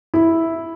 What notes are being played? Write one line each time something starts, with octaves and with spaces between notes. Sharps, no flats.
E4